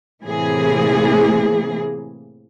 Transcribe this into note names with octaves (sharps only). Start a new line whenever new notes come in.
A2 C3 E3 A#3 G#4